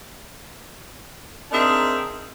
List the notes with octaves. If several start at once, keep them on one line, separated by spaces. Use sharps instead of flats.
C4 D4 D#4 G#4 A#4 E5